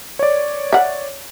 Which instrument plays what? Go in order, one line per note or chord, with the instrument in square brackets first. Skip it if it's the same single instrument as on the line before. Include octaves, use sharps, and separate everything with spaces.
[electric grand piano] C#5 D5
[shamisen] E5 F#5